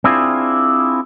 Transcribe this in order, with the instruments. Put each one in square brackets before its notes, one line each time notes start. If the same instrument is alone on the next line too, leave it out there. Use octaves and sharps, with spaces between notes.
[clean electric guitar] C4 D4 E4 F4 G#4